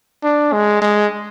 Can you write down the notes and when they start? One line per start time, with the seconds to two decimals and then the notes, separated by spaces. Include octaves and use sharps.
0.24 D4
0.53 G#3
0.82 G#3